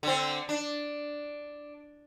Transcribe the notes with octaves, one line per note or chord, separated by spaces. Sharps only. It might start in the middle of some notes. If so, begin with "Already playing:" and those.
D3 C4
D4